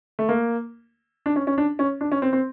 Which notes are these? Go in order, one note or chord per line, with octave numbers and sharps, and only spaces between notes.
A3
A#3
D4
C#4
C#4
D4
C#4
D4
C#4
C4
C4